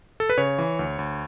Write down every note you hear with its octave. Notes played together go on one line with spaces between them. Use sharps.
A4
B4
C#3 C#5
E3
D2
D2